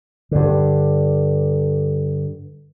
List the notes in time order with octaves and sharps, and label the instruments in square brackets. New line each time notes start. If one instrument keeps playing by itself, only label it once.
[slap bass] G2 D3